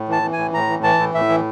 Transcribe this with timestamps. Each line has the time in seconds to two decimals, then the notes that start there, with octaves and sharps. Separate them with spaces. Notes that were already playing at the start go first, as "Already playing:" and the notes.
Already playing: A2
0.08 E3 A5
0.22 E3
0.33 G#5
0.38 A2
0.54 A2 A#5
0.69 E3
0.83 E3 A5
0.99 A2
1.15 A2 E5
1.29 E3